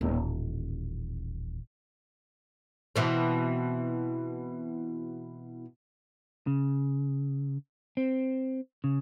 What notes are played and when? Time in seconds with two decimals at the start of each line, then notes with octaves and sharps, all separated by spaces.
0.01 D#1 A1
2.96 B2 E3 C4
6.47 C#3
7.97 C4
8.84 C#3